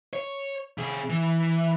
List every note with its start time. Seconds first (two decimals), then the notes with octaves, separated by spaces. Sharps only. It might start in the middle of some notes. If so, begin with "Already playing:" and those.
0.13 C#5
0.78 C3 G#4
1.10 E3